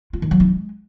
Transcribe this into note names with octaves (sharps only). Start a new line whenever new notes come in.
F4
D#3
F#3
D#4
G#3